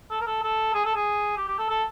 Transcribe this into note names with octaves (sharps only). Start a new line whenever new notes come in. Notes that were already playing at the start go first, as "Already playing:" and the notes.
A4
A#4
A4
A4
G#4
A4
G#4
G4
G4
A4
A4